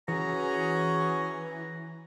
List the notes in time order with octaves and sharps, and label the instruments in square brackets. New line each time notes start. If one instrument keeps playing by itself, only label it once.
[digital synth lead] E3 [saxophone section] C#4 F#4 G#4 [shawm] A#5